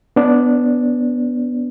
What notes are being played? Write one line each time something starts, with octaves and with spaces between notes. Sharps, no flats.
B3 D4